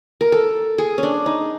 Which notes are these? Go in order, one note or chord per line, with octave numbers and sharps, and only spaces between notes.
A#4
A4
G#4
C#4
D4
D#4